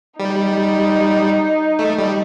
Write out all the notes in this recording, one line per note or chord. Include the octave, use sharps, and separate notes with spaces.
G3 D#4
A3
G3